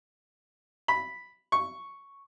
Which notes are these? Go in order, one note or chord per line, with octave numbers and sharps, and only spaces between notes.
B5
C#6